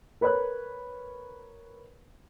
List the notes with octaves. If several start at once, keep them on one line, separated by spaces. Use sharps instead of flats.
A#4 B4 C#5 B5 F#6